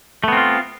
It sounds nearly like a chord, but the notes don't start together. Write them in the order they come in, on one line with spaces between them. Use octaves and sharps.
A3 B3 C4 F4